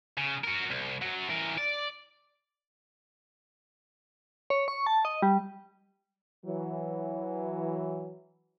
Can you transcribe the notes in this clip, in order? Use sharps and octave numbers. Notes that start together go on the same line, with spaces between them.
C#3
F#4 A#4
C2
F#2 F#3
E3 A#4
D5
C#5
C#6
A5
D#5
G3
E3 F#3